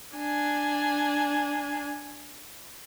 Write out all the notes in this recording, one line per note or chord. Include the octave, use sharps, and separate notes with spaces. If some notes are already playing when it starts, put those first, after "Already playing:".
D4 G#5